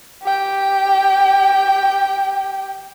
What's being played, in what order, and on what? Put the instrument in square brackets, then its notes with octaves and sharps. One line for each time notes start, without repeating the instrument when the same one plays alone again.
[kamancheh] G4 G5